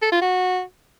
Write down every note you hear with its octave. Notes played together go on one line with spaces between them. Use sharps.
A4
F4
F#4